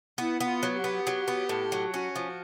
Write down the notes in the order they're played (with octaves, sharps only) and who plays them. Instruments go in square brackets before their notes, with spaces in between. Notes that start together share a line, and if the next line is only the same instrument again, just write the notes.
[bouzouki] B3 [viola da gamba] E4
[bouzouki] B3
[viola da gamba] F4
[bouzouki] F#3
[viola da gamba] G4
[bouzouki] B3
F#3
B3
A2
F#3
[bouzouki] C#4 [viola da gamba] F#4
[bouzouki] F3